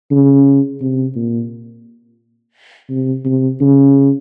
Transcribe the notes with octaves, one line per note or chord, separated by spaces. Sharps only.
C#3
C3
A#2
C3
C3
C#3